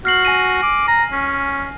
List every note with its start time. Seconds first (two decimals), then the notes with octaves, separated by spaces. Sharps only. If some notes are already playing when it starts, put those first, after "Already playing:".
0.05 F#4 F6 C7 F#7
0.25 G#5 A#6 D#7
0.63 D6
0.88 A#5
1.12 C#4